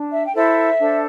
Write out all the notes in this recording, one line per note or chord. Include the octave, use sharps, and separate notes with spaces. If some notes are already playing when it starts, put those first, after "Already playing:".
Already playing: D4
E5
G5
E4 A4 C5 E5
D4 A4 C5